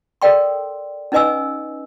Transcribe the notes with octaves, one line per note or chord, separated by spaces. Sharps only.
A4 A#4 D5 G5 C6
C#4 D#4 B4 D#5 G#5 E6